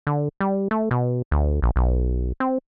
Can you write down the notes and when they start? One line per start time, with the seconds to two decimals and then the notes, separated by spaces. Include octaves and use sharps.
0.07 D3
0.41 G3
0.71 A3
0.91 B2
1.31 D2
1.62 A#1
1.76 B1
2.40 C4